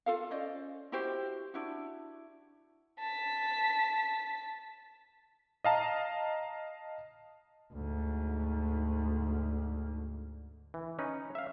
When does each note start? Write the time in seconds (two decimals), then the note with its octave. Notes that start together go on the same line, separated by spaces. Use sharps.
0.06 F4 A4 F5
0.31 C#4 C5 D5 D#5
0.92 E4 F#4 G4 C5
1.54 D4 E4 F#4
3.00 A5 B6
5.64 D#5 F5 A5 A#5
7.73 D2 G#2
10.74 E3
10.99 C#4 D#4 B4
11.35 E5 F5